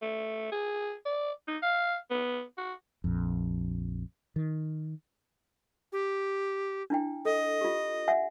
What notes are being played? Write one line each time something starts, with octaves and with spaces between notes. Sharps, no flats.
A3
G#4
D5
D#4
F5
B3
F#4
A#1 F2
D#3
G4
D4 E4 G5
A4 D#5
F4 G4
E5 F#5 G#5